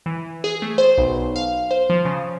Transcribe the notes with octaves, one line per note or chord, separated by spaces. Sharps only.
E3
G#4
A3
C5
B1
F5
C5
F3
C#3